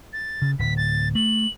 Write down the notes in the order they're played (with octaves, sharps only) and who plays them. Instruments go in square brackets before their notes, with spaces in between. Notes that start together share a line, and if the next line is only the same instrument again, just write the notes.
[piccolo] A6
[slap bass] C#3
[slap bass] D1 [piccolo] B6
[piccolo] A6
[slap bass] A3 [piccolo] F#7